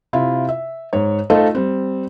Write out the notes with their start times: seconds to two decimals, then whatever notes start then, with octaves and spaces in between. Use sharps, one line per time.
0.13 C3 E4 F4
0.49 E5
0.93 G#2 C#5
1.30 A3 D#4 F4 A4 C5 D#5
1.55 G3 C4